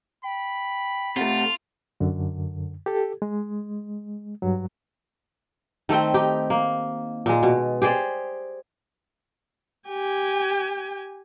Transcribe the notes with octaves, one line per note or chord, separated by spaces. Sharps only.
G5 B5
C3 A3 F4 F#5
F#2 D3
G4 A4
G#3
G2 F#3
D#3 A3 C4 G5
D#4 G4
A#3
A#2 G#3
B2
G4 G#4 C5 D5
G4 G#5